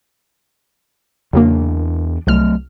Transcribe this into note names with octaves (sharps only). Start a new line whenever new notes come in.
E2 C#3 F#3 A#3 B3 D4
C2 F#3 A3 F6